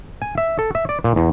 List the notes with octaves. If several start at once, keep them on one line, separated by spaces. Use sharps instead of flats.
G#5
E5
A4
E5
D5
A#2
E2